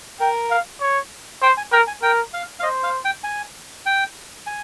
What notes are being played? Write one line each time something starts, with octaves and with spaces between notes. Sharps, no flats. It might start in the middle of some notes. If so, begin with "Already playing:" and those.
A#4 G5
F5
C#5
C5 G5
G#5
A#4 G5
G#5
A#4 G5
F5
F5
C5 D#5
F5
G5
G#5
G5
G#5